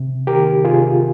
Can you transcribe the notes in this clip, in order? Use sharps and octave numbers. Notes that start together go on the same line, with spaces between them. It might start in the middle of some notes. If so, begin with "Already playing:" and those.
Already playing: C3
D#3 G4 A#4
C3 F4 G#4